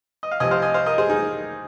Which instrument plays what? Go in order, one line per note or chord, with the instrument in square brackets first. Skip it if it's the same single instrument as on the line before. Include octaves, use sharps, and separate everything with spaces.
[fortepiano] D#5
F5
C2 C3 F3 D#5 G#5
C5 F5
D#5 G#5
C5 F5
A#4 D#5
G#4 C5
D#4 G#4